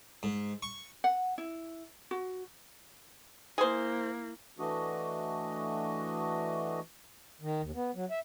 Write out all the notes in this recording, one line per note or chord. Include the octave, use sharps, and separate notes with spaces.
G#2
C#6
F#5
E4
F#4
A#3 E4 G#4 C5
E3 A3 D4 F#4 D#5
D#3
D#2
B3
F#3
E5